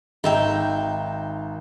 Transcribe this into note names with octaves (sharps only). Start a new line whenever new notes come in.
G#1 D#4 E5 G5